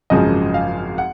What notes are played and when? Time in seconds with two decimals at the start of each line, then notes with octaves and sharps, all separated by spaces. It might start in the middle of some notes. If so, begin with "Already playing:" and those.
0.10 G#1 F#2 C#3 F3 G#3 D#5
0.54 F5
0.98 F#5